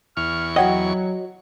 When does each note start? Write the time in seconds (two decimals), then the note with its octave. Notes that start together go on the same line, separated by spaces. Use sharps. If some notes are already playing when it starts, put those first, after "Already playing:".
0.17 E2 C#6 F6
0.56 F#3 F#4 C#5 D#5 F#5 G5